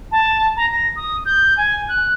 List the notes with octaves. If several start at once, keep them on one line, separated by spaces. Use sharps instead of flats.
A5
A#5
A#6
D#6
G6
G#5
F#6